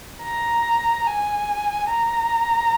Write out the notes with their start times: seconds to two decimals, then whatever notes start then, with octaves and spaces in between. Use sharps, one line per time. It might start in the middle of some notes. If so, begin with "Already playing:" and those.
0.23 A#5
1.07 G#5
1.91 A#5